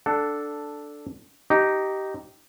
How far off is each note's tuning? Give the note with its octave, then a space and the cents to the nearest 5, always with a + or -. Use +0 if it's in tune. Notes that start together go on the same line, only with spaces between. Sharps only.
D4 +0 A4 +0 F#5 +15
D#4 +0 G4 -15